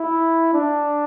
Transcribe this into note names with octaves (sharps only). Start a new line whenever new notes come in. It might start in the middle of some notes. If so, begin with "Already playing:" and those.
Already playing: E4
D4